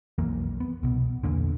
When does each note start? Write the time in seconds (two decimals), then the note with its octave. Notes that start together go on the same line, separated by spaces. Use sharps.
0.18 B1 F2 E3 A#3
0.60 B3
0.83 C2 B2
1.24 E2 A#2 D3